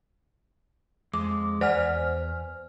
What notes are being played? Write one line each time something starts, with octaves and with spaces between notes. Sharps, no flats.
F2 G#3 D6
E2 C5 D5 F#5 G#5 F6